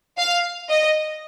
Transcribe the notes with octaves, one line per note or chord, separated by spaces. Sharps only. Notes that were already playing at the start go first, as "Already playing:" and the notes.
F5
D#5